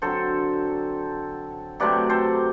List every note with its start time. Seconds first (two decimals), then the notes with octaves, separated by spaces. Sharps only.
0.02 D3 F#3 C4 A4 C5
1.80 C3 F#3 A3 C4 B4 D5
2.09 A4 C5